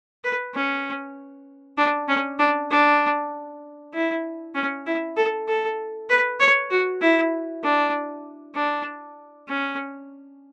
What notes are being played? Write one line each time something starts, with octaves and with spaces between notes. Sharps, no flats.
B4
C#4
D4
C#4
D4
D4
E4
C#4
E4
A4
A4
B4
C#5
F#4
E4
D4
D4
C#4